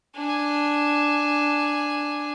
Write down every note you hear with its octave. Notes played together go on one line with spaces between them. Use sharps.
D4 G#5